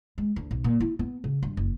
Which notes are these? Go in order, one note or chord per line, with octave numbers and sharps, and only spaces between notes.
G#3
D2
B1
A#2
E4
B3
C#3
G2
F#1